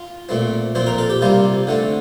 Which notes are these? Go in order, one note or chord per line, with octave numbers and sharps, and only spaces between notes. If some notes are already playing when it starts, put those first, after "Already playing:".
Already playing: F4
A#2 A3 C4
A#2 F3 C4 C5
A#4
A4
G4
C3 G3 A#3 F4
D3 A3 C4